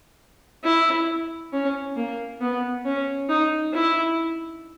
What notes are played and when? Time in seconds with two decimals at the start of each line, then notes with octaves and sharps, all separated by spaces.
0.64 E4
1.53 C#4
1.97 A#3
2.41 B3
2.85 C#4
3.29 D#4
3.74 E4